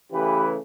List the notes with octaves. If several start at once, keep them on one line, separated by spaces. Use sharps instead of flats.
C#3 E3 A3 G4 B4